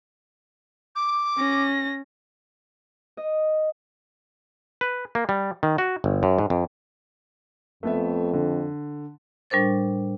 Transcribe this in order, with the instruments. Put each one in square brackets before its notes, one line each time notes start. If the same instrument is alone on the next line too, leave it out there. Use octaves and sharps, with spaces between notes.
[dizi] D6
[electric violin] C#4 A#6
[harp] D#5
[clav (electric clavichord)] B4
A#3
G3
D#3
F#4
G1
F#2
G#2
F2
[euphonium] F2 [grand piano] A3 B3 E5
[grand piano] D3
[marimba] A2 G3 D4 A#4 C5 A6